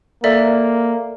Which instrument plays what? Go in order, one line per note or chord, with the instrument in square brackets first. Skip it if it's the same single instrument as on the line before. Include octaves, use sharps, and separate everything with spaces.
[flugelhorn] A#3 [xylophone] A4 D5 E5